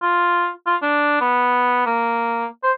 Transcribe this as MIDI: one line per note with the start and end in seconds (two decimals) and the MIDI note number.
0.02 0.49 65
0.67 0.76 65
0.82 1.16 62
1.21 1.85 59
1.86 2.46 58
2.64 2.72 72